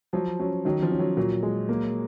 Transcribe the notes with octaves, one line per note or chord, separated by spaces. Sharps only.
F3 F#3
F#3 C#4
D#3 F#3
F3
C#4
F#3
A#2 F#3
G#3
A#3